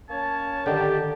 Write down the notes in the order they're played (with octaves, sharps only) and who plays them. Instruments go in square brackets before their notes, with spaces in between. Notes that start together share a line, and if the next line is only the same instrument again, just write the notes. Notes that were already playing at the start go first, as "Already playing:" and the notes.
[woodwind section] A#3 C#4 C#5 [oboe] A5
[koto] D3 D#3 [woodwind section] G4